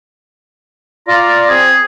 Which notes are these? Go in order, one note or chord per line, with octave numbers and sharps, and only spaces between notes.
F4 D5 A#5
C4 G#4